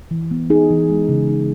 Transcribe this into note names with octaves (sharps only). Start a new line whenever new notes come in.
E3
B3
D#4 G#4
E3
G#3
C#3
D#4